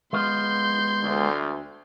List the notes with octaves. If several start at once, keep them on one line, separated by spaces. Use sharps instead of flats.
G#3 B3 F4 C6 G6
D2